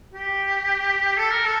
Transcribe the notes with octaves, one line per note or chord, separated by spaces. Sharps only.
G4
A4
A#4
A4